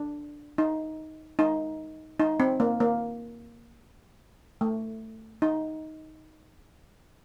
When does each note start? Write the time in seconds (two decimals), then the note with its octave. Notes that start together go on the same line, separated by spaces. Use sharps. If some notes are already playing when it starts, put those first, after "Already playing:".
Already playing: D4
0.58 D#4
1.39 D#4
2.20 D#4
2.40 C4
2.60 A#3
2.80 A#3
4.61 A3
5.42 D#4